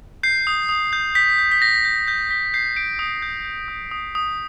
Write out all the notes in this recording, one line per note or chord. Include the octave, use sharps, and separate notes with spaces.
G6 C7
D#6
D#6
G6
G6 B6
G6
B6
G6 A#6
G6
G6 B6
G6 B6
G6 C7
G6 D7
D#6
G6
G6
D#6
D#6
D#6